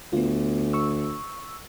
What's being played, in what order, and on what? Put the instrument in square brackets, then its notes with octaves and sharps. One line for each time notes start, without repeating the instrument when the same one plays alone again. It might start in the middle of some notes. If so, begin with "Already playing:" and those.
[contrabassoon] D2 [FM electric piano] B3 F4
[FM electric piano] C#6 E6